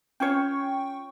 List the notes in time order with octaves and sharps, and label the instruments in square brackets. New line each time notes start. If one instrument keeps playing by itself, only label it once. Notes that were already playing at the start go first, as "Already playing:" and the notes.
[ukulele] C#4 F4 C#5 [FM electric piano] G5 C#6